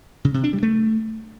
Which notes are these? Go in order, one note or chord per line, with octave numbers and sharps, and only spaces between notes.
C#3
C3
D4
G3
A3